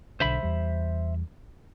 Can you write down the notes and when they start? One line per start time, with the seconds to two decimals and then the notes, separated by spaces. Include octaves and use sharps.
0.20 B1 D3 C5 E5 B5
0.43 E2 G3